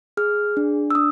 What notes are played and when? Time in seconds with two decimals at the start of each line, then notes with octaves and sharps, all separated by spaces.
0.17 G#4 F6
0.57 D4
0.91 E6
0.95 D4 D#6